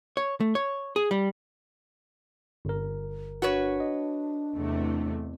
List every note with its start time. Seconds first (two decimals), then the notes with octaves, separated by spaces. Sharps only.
0.17 C#5
0.40 A3
0.55 C#5
0.96 G#4
1.11 G3
2.65 G1 A#4
3.42 D4 F#4 B4 C#5
3.80 D#5
4.56 E2 C3 A3